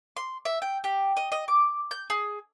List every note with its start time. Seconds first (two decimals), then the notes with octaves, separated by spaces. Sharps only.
0.17 C6
0.45 E5
0.62 G5
0.84 G4
1.17 D#5
1.32 D#5
1.48 D6
1.91 G6
2.10 G#4